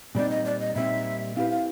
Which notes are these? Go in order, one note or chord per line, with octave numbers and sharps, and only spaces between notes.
A#2 G3 C4 D#4 D5
D#5
D5
D#5
A#2 G3 C4 D#4 E5
C4 E4 G4 B4 F5
F5